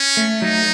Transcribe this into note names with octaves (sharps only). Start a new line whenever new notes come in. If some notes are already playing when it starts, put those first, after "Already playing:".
Already playing: C#4
A3
F#3 D#4